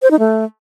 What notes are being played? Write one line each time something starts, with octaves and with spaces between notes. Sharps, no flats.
C5
D#4
A3